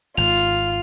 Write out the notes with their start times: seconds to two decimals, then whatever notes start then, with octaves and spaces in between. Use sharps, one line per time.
0.18 G#1 G#2 F4 F7